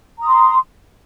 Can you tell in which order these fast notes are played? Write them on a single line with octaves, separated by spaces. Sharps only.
A#5 D#6 C6